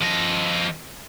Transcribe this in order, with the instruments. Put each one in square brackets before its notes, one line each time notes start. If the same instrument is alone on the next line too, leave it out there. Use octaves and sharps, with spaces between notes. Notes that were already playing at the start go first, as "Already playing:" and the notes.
[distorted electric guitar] F3 D#5